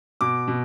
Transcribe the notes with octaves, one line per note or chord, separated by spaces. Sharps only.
B2 D6
B2